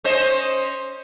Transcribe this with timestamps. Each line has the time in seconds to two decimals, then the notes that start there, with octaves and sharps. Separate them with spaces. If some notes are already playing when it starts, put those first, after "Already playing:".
0.04 C#4 C5 D#5